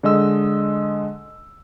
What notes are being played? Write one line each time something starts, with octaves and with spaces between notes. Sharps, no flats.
D3 G#3 D#5 E6